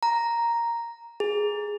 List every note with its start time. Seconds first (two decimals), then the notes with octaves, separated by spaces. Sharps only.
0.03 A#5
1.20 G#4